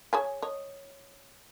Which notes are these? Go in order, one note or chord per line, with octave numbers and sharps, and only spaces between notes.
G#4 C#5 G#5
C#5 D#5